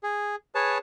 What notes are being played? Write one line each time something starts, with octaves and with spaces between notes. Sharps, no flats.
G#4
G#4 B4 C#5 A5